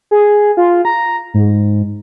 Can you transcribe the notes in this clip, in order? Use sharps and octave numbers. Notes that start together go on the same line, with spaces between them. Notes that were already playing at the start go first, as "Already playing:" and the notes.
G#4
F4
A#5
G#2